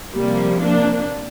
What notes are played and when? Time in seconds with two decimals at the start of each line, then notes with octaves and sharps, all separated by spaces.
0.14 C3 F3 G3 A#3
0.61 A#3 D4